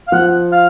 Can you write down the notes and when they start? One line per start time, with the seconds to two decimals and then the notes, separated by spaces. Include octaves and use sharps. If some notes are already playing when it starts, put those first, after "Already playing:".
0.08 F5
0.12 F3 F#5
0.52 F5